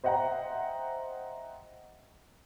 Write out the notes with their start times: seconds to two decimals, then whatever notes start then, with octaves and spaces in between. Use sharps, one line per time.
0.04 C5 D#5 E5 F#5 G5 A#5